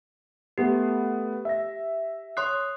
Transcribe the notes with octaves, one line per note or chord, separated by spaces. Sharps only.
A3 B3 G4 A4
E5 A#6
C#5 C6 D#6 F#6 C7